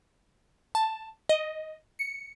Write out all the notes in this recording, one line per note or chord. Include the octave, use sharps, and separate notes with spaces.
A5
D#5
C#7